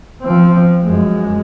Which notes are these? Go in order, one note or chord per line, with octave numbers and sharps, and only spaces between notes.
F3 C4
F#2 G#3